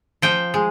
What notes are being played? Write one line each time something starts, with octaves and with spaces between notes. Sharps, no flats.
F3 G5
G#3